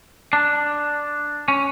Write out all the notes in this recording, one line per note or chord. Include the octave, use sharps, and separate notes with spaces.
D4
C#4